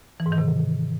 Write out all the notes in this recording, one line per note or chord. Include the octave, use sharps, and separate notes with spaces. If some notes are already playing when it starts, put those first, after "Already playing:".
E3
G#2
D#3
C3